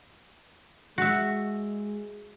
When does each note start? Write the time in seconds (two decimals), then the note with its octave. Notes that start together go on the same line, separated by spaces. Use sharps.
0.98 G#3 F#4 E5